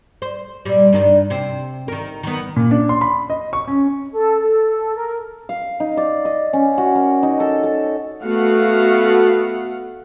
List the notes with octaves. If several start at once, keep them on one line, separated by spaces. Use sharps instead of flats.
C5
A#2 G3
G2 D#3 D4
C3 C4
D#3 A#4
D#3 B3
A#2
D4
C6
B5
D#5
C#6
C#4
A4
A4
A#4
F5
D#4
D5
D#5
C#4
F#4
A#4
D#4
A4
A4
A3 B3 F#4 F5 F#5